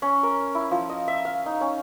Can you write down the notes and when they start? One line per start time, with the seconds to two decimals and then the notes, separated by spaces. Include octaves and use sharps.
0.02 C#4
0.23 A#4
0.55 E4
0.71 F3
0.89 D#5
1.08 E5
1.25 F5
1.46 D#4
1.61 C#4